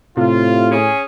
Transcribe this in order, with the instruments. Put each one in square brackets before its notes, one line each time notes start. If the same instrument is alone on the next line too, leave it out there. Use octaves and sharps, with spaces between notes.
[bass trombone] A2 [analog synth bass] C3 [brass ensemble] F4
[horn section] C#4 G#4